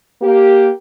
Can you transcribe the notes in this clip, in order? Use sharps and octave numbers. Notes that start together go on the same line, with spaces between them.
A#3 G4